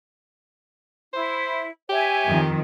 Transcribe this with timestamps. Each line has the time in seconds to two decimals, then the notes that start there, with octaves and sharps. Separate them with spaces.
1.14 E4 C5
1.90 G4 C#5 E5 G#5
2.27 F2 D#3